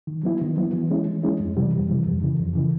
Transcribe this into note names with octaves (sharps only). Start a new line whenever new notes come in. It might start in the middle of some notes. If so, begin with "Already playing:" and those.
D#3
F#3 B3 E4
D#3
F#3 B3 E4
E3
G#3 C#4 E4
E3
G#3 C#4 E4
F2
C3 E3 G3
F2
C3 E3 G3
F2
C#3 E3
F2
C#3 E3